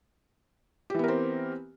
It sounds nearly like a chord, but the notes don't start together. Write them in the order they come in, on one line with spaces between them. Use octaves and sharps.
G4 E3 B3 A#4 C4